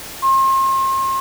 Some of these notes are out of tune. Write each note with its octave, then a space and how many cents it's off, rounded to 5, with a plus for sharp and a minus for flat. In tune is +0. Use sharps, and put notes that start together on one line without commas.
C6 +40